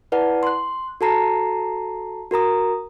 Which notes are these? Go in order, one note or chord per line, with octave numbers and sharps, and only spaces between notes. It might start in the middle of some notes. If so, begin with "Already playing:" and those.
E4 B4 D5 F#5 A5
C6 F#6
F#4 A4 A5 A#5 C7
F#4 A#4 A#5 D#6